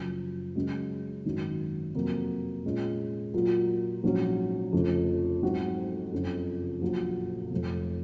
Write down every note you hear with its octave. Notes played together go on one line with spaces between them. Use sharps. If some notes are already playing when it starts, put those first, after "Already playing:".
Already playing: F#1 F#2 F3
F#2 C#3 G#3 C#4 F#4
G#1 F#2 D#3 F#3
F2 C3 F#3 A#3
A#2 G#3 C#4 F4
A#2 F#3 A#3 F4
A#1 G#2 F#3 C#4 F#4
F1 F2 C#3 F3
G#2 F#3 C4 F#4
F#1 F2 C#3 F3
A#1 A#2 F#3
F1 F2 C3